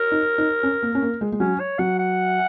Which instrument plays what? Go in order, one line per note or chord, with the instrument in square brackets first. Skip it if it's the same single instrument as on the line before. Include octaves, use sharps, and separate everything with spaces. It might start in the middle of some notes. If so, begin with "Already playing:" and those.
Already playing: [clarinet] A#4
[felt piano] D#4
D#4
C#4
A#3
C#4
A#3
G#3
G#3
[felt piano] F#3 [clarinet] C#4
[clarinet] C#5
[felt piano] F#3 [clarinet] F#5
[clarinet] F#5